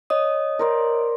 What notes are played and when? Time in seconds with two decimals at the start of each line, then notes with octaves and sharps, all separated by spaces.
0.10 C#5 D#5 D#6
0.59 A#4 C5 D5